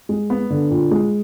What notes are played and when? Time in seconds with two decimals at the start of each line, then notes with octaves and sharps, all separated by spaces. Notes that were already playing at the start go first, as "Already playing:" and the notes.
0.09 G#3
0.30 B3
0.50 D3
0.70 A#2
0.91 G#3